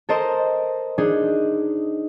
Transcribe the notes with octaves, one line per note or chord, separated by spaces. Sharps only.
A4 A#4 C5 D#5
D4 D#4 G#4